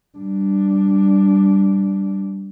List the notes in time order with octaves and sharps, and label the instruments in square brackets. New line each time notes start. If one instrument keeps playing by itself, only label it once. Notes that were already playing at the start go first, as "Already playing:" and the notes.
[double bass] G3 D4